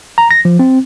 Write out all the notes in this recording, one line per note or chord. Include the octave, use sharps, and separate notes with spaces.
A#5
A#6
F3
C4